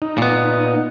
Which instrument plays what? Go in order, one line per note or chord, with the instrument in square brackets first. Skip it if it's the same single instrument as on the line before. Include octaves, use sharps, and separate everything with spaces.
[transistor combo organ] D#4
[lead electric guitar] A#2 B3